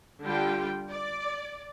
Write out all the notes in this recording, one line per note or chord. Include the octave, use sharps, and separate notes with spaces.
D3 G3 F4 G5
D5